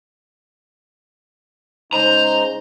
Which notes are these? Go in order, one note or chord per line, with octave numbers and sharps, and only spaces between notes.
C#3 G#3 D#4 C5 A#5